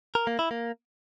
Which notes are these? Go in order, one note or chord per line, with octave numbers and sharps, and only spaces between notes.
A#4
A#3
E4
A#3